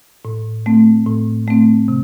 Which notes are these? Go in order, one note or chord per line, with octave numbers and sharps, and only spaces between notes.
A2
A3 C4
A2
A3 C4
C3